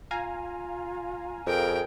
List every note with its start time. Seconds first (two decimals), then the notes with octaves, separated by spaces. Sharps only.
0.11 F4 F5 G#5 A#5
1.47 F2 G#4 A#4 G5